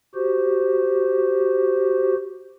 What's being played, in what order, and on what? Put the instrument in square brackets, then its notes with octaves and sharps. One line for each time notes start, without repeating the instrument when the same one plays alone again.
[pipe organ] F#4 G4 C5